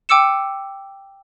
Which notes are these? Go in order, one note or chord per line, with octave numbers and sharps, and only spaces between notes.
G5 D6 E6 C#7 E7